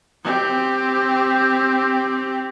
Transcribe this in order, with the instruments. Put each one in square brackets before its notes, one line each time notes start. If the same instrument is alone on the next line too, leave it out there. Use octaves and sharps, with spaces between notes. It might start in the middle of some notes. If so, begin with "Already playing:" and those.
[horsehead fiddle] C4 G4